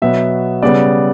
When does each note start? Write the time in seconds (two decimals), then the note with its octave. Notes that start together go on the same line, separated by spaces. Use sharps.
0.02 B2 F#3 B3 E5
0.63 C#3 G3 B3 D5